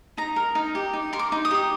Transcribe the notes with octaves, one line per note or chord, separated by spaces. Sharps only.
D#4 A#5
A#4
D#4
G4
D#4
A#4 C6
D6
D#4
D#6
G4